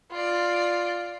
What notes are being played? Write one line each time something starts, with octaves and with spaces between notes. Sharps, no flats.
F4 D5